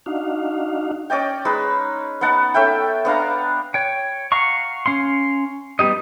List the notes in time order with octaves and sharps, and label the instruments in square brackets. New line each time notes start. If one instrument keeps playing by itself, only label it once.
[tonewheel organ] D4 D#4 F#4 F5
[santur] C#4 D5 D#5 G5
G#3 D#4 B4 E6
B3 D#4 F#5 A5
C#4 A4 E5 G5
B3 D4 F5 A#5
[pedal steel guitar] C#5 G5
F5 F#5 A#5 C#6
C#4 F5 C6
G3 B3 D#4 G4 D#5